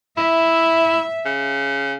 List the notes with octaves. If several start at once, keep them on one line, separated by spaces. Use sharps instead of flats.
E4 E5
C#3